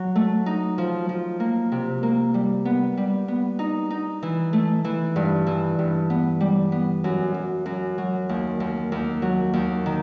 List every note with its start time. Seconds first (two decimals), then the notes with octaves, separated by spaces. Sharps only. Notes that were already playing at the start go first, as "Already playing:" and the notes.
Already playing: F#3
0.15 A3
0.46 D#4
0.78 F3
1.09 F3
1.40 A#3
1.72 C3
2.03 A#3
2.34 G3
2.65 B3
2.97 G3
3.28 B3
3.59 D#4
3.90 D#4
4.23 E3
4.53 A3
4.84 E3
5.16 G2
5.47 E3
5.79 G2
6.10 B3
6.40 G3
6.72 B3
7.04 F#2
7.34 F#2
7.66 F#2
7.98 F#3
8.29 D#2
8.60 D#2
8.92 D#2
9.22 F#3
9.53 D#2
9.86 D#3